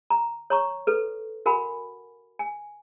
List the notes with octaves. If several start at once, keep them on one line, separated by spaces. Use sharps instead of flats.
A#5
C#5 A#5 C#6
A4 B4
F#4 A#4 F#5 G#5 B5
G#5